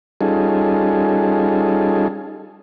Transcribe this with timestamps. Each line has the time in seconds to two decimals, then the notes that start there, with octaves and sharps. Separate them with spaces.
0.21 G3 C#4 D#4 F4 G#4 A4